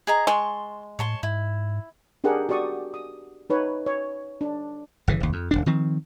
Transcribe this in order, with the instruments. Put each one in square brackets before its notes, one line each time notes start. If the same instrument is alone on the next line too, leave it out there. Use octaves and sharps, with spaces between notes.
[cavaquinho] G#4 D#5 A#5
[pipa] G#3 [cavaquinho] A5 C6 C#6
[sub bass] A2 [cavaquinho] C#5 A5 C6
[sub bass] G#2 [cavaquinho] E4
[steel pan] D4 G4 G#4 A#4 F#5
F#4 G4 D5 C#6 D#6
D#6
D#4 B4 C#5
C#5
D4
[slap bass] G1 C#3 E3
F1 D#2
F2
D1 G1 D4
D#3 F3 C4